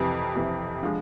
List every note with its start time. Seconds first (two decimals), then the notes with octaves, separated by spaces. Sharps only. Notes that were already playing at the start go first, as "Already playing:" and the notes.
Already playing: F2 C3 E3
0.35 F2 C3 E3
0.82 D3 F3 G#3